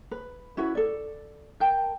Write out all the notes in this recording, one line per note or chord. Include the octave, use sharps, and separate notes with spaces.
B4
C#4 E4 F#4 B4
A4 D5
A#4 G5 A5